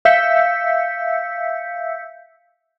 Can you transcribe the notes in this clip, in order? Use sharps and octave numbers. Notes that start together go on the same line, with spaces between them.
E5 F5 E6 G6 B6 C#7